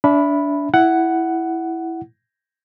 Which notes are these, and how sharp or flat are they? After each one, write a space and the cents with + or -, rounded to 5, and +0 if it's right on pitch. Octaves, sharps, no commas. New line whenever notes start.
D4 -25 E5 +0 B5 +0
E4 +0 F#5 +5